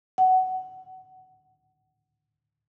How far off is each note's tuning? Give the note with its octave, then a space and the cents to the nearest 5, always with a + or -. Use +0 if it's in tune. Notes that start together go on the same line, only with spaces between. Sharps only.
F#5 +15